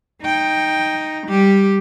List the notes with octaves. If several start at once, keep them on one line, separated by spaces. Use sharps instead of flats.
D#4 G5
G3 G4